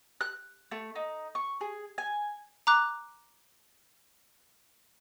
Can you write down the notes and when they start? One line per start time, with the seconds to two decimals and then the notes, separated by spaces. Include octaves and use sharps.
0.21 F#6
0.71 A3
0.95 D#4
1.35 C#6
1.61 G#4
1.98 G#5
2.67 A#5 D6 F#6